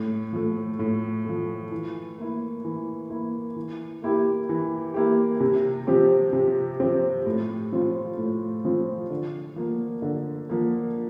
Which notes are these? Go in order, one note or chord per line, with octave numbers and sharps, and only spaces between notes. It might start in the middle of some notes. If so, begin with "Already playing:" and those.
Already playing: A2
F3 A3
A2
F3 A3
E3
A#3 E4
E3
A#3 E4
E3
A#3 E4 G4
E3
A#3 E4 G4
C3
F3 C4 G4
C3
F3 C4 G4
A2
F3 C4 F4
A2
F3 C4 F4
D3
F3 A#3
D3
F3 A#3